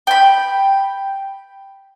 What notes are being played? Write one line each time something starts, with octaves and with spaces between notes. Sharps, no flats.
G5 B5